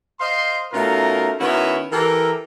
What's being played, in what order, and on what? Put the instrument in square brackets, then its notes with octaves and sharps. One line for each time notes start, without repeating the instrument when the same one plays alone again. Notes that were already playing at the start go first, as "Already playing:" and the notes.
[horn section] C5 D#5 F5 C6
B2 A3 C#4 D#4 F4 A#4
D#3 B3 C#4 E4 F#4
E3 G4 A4 A#4